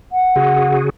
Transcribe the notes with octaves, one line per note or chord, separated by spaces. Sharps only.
F#5
C#3 F#4 G#4